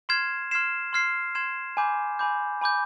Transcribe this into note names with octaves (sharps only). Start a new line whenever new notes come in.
C6 F6 G#6 C7 E7
C6 F6 G#6 C7 E7
C6 F6 G#6 C7 E7
C6 F6 G#6 C7 E7
G#5 B5 D6 G6
G#5 B5 D6 G6
G#5 B5 D6 G6